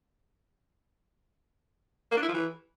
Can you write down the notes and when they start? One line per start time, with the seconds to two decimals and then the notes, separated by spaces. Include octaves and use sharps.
2.11 A#3
2.17 D4
2.23 E4
2.28 F3
2.34 E3